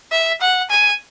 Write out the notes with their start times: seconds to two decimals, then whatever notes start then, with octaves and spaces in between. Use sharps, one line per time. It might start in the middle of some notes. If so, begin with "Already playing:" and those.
0.12 E5
0.41 F#5
0.70 G#5